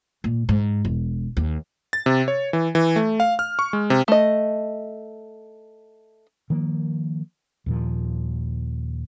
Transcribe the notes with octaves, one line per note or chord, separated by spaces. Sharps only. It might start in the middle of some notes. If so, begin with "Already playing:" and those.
A#2
G#2
E1
D#2
A6
C3
C#5
E3
E3
A3
F5
F6
C#6
G#3
C3
A3 D#5
D#3 F3 A#3
D#2 A#2 F3